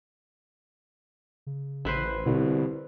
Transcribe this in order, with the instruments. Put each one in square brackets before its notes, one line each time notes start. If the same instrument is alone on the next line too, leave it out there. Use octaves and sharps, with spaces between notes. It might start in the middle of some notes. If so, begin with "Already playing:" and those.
[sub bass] C#3
[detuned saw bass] A1 [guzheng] E4 B4 C5
[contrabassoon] C2 [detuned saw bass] B2 [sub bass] D3